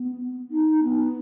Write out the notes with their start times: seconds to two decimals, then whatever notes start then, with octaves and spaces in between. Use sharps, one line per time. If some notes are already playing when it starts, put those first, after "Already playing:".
Already playing: B3
0.51 D#4
0.84 B3